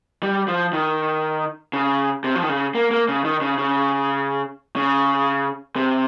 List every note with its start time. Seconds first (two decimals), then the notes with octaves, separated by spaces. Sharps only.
0.23 G3
0.48 F3
0.73 D#3
1.73 C#3
2.24 C3
2.35 F3
2.43 D#3
2.49 C#3
2.75 A#3
2.91 A#3
3.09 C#3
3.24 D#3
3.41 C#3
3.58 C#3
4.76 C#3
5.76 C3